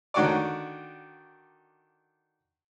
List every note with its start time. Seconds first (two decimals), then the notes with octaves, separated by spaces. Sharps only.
0.14 D3 D#3 F#4 C#5 D5